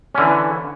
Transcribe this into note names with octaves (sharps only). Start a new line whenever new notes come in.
D3 E3 C#4